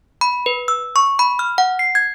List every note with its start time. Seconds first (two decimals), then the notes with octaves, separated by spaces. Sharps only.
0.21 B5
0.46 B4
0.68 E6
0.96 C#6
1.19 B5
1.39 F6
1.58 F#5
1.79 C7
1.95 G#6